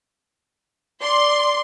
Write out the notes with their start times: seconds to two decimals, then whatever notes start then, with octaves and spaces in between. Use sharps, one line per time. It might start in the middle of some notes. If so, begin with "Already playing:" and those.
1.02 D5 C6